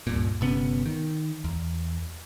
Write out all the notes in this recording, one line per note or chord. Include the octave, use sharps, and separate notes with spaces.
C#2 G2 A#2
G1 C3 B3 C#4
D#3
E2